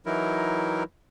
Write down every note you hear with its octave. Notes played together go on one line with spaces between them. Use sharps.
E3 F#3 D#4 E4 A#4